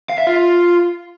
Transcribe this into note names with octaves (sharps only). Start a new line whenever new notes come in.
F5
E5
F4